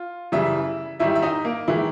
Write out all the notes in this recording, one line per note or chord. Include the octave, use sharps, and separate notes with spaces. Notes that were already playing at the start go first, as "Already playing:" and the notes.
Already playing: F4
F#2 C#3 E3 G3 E4 E5
G#2 D#3 G3 E4 E5
E5
D#4 D#5
A#3 A#4
D#3 E3 G#3 E4